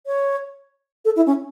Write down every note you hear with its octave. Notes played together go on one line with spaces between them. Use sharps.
C#5
A4
E4
C#4